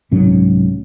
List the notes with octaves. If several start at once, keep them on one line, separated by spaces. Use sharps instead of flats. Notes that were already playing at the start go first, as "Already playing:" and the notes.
C2 G#2 F#3 C#4